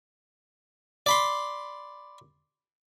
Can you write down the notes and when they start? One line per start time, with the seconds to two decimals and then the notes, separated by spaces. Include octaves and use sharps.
1.06 D5 B5 C6